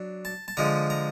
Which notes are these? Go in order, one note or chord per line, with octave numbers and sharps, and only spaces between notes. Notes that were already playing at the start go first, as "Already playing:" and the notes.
Already playing: F#3 D4
A5
A5
D3 F3 G#3 A#5
A#5